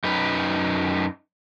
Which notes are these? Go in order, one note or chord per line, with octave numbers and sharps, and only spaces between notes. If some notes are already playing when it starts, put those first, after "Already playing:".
F#2 D#4 B4